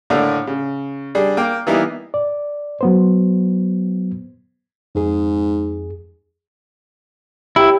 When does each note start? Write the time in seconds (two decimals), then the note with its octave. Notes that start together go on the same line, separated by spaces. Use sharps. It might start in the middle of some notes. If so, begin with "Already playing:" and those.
0.10 A2 D3 A3 A#3 D4
0.47 C#3
1.15 G3 D4 G#4
1.37 A#3 G5 D6
1.67 E3 G3 A#3 B3 D#4 E4
2.14 D5
2.81 F#3 B3 C5
4.95 F2 G#2 G#4
7.56 E4 G4 C#5